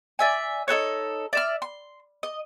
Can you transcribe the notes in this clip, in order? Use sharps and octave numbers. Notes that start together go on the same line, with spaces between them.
D5 E5 G#5
D#4 A4 B4 C#5
D5 E5 F6
C6
D#5